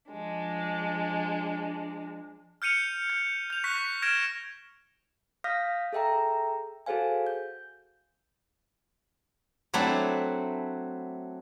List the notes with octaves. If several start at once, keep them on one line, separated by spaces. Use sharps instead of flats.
F3 G#3 D4
F6 G6 C#7 D#7 F7
G6
G6 F7
C#6 F#6 B6
F6 G#6 A#6 D7 E7
F5 D#6 F6 G6 A#6 B6
G#4 A4 E5 G5 A#5
F#4 G#4 A4 C5 F5 G#5
G6
F#3 A3 C4 D4 E4 A4